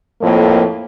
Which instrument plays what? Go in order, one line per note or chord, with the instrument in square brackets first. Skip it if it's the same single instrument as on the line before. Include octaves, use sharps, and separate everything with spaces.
[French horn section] F2 A2 A#3